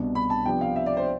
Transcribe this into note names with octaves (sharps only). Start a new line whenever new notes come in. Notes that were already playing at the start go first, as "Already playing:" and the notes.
Already playing: C2 B2 B3 D4
B5
A5
C3 F3 B3 D4 G5
F5
E5
D5
C5